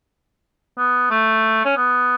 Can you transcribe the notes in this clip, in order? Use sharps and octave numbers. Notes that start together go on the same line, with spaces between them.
B3
A3
C#4
B3